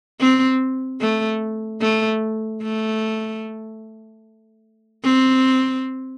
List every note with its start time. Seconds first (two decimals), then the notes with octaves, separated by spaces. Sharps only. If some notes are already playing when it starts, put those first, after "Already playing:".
0.20 C4
1.01 A3
1.82 A3
2.63 A3
5.04 C4